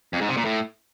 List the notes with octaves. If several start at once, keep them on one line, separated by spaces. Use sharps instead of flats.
F2
G#2
C3
A#2
A2